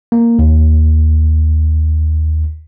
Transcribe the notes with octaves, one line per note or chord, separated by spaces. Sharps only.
A#3
D#2